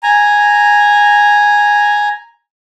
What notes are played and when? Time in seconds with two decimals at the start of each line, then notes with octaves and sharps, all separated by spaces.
0.03 G#5 A#5